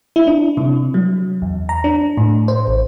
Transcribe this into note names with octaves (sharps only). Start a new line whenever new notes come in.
E4
D4
C3
F#3
E2
A#5
D4
A2
C5
A1